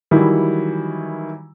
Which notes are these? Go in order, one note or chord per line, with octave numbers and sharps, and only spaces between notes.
D#3 E3 F#3 G3 E4